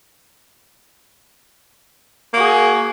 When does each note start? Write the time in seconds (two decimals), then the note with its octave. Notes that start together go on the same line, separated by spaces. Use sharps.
2.33 A#3
2.37 F#4
2.40 G#4